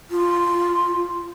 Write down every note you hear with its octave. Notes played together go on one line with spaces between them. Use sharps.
F4